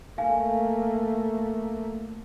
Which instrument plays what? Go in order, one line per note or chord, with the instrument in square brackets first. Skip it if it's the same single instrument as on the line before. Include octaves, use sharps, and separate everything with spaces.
[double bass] A3 A#3 [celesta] F5 G#5